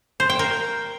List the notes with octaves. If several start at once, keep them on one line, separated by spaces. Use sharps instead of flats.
C5
G5
A#4